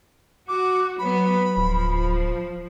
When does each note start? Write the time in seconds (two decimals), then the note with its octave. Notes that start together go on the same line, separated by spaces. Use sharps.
0.48 F#4 D6
0.99 F#3 B3 B5
1.57 D1 F3